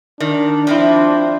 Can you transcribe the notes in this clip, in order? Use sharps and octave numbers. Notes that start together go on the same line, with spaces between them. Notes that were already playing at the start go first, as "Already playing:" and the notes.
D#3 D4
F3 C4 E4